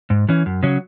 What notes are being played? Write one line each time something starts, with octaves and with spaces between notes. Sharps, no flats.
G#2
E3 C#4
F#2
C#3 F#3 C#4